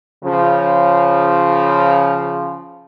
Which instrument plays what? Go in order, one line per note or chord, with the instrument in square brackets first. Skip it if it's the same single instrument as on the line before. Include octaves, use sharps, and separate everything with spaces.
[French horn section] C#3 F3